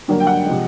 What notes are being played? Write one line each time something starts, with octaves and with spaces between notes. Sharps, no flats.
G2 D3 F#3 A#3
G5
F#5
C3 F3 G#3